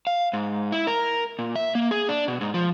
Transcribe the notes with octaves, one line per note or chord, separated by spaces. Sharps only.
F5
G#2
E4
A#4
A#2
E5
A#3
G#4
D4
B2
G#2
F3